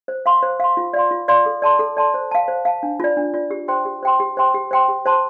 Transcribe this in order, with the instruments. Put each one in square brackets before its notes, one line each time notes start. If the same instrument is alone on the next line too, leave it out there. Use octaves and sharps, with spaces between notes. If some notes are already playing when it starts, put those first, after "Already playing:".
[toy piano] C5
F5 C6
C5
F5 C6
F4
D5 F5 C6
F4
D5 F5 C6
A4
D5 A5 C6
A4
D5 A5 C6
C5
F5 A5
C5
F5 A5
D4
F4 D5
D4
F4 D5
G4
C5 G5 C6
G4
C5 G5 C6
G4
C5 G5 C6
G4
C5 G5 C6
G4
C5 A5 C6